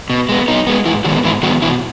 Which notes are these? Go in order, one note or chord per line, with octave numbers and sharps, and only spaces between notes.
B2
G#3 B3
B2 D#4
G#3 B3
G#2 E3 E4
D#3 F#3 G#3 B3 F#4
G#2 E3 E4
D#3 F#3 G#3 B3 F#4
B2 E3 E4